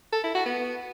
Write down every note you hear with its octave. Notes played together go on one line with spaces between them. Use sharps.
A4
E4
F#4
B3